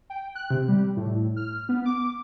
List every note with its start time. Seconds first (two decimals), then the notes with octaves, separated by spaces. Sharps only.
0.10 G5
0.35 F#6
0.51 C3
0.69 G3
0.97 A2
1.36 F6
1.69 B3
1.85 D6